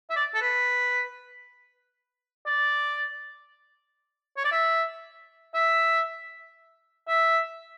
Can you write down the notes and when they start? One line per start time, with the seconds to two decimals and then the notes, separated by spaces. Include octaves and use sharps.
0.10 E5
0.16 D5
0.34 A4
0.42 B4
2.46 D5
4.37 C#5
4.45 D5
4.52 E5
5.54 E5
7.08 E5